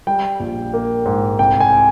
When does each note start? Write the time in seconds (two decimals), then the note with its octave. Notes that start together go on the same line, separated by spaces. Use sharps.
0.07 G3 G5
0.40 A#1
0.74 A#3
1.06 G#2
1.39 C2 G5
1.60 G#5